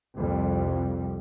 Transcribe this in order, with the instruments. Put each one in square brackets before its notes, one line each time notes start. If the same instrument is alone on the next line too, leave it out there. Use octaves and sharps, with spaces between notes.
[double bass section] C2 F2 G3